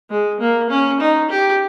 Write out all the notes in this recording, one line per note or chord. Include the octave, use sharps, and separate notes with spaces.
G#3
A#3
C#4
D#4
G4